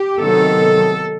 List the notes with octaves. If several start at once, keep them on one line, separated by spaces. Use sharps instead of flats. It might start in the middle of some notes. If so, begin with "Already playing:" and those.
Already playing: G4
C3 D#3 F#3 B3 A4